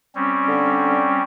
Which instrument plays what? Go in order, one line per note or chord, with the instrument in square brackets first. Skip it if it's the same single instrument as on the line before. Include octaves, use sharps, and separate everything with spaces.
[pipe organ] G3 C4 C#4
[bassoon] D3